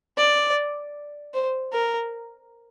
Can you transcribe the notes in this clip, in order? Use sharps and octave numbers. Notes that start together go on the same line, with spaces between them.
D5
C5
A#4